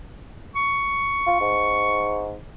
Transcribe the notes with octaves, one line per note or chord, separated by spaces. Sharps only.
C#6
F4
G#2